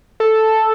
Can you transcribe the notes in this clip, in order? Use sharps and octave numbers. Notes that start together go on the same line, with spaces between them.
A4